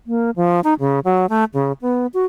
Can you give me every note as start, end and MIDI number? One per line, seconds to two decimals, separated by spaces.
0.07 0.30 58
0.36 0.60 53
0.64 0.74 63
0.80 1.00 49
1.05 1.26 54
1.29 1.44 57
1.54 1.72 49
1.82 2.07 59
2.14 2.25 66